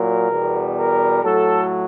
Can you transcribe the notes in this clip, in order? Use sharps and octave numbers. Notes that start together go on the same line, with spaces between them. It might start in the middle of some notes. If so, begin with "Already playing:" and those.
Already playing: A#2 F#3 A#4
E2 B2 G3
A#4
A2 F#3 A4